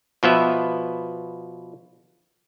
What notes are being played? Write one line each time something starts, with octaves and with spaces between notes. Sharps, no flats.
B2 F3 B3 E5